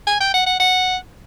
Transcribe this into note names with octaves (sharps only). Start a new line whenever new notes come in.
G#5
G5
F#5
F#5
F#5